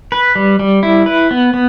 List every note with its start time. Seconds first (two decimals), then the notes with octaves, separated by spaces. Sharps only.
0.12 B4
0.35 G3
0.59 G3
0.83 E4
1.06 B4
1.31 B3
1.54 B3